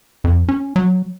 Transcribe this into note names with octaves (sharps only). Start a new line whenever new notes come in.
F2
C#4
F#3